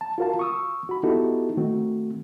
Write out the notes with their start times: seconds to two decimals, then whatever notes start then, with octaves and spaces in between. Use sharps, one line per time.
0.01 A5
0.18 F4 F#4 A#4 F5 A5
0.39 C#6 D#6 E6
0.89 F#4 B5
1.03 B3 D#4 E4 F#4 G4 A4
1.57 D#3 A3 C4 F#4